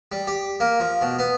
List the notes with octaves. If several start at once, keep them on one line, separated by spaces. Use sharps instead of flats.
G3
G4
A#3
F3
B2
B3